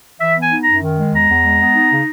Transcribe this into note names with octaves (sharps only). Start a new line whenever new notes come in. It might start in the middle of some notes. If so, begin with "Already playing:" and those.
E3 E5
B3 G#5
D#4
F#2 A#5
D#3
G#3
E2 A#5
E2
G#3
B3
D#4
C#3